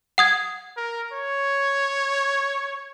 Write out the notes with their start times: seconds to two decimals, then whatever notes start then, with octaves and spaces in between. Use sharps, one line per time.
0.18 F#5 D#6 G#6
0.77 A#4
1.13 C#5